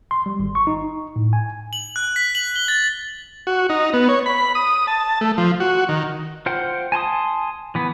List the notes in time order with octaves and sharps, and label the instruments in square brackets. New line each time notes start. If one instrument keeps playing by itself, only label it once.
[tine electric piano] C6
G3
G#1
C#6
D#4
A2
G#5
[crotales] F#7
F#6
B6
F#7
G7
A6
[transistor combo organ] F#4
D#4
B3
C#5
B5
D#6
A5
A3
F3
F#4
D#3
[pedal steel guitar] F4 C5 F#5 G5
G#5 A5 C6 D#6
E3 B3